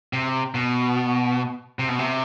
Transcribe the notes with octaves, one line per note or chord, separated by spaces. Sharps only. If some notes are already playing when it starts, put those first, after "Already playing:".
C3
B2
C3
B2
C3